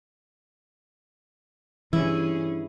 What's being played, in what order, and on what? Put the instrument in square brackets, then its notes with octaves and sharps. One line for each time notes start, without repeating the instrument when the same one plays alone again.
[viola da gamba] G2 C#4 G#4 [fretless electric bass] E3 [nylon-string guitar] E4